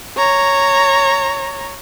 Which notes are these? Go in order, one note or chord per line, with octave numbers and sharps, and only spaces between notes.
C#5 A#5